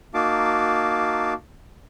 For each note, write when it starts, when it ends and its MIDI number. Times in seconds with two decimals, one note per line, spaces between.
0.14 1.33 58
0.14 1.33 63
0.14 1.33 66
0.14 1.33 77
0.14 1.33 81
0.14 1.33 86